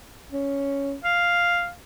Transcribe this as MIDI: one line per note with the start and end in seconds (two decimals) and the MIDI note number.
0.32 0.94 61
1.04 1.70 77